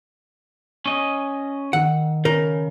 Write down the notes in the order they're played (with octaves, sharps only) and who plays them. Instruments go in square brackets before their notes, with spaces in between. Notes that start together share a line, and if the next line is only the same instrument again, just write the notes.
[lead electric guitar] C#4 D#5
[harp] D#3 E6 [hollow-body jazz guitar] F#5
[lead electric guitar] C#3 [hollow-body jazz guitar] A#4